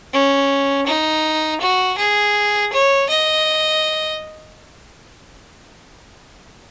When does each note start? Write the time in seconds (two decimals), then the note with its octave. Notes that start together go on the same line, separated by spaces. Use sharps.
0.13 C#4
0.87 D#4
1.61 F#4
1.98 G#4
2.73 C#5
3.10 D#5